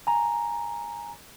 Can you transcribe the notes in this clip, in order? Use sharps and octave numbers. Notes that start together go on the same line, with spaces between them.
G#5 A#5